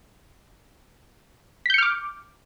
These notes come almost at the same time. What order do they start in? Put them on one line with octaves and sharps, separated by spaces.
B6 G6 C#7 F6 D6